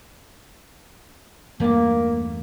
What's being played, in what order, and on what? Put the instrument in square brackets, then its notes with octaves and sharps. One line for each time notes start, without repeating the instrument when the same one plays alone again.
[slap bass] E2 G2 A3 [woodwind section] A#3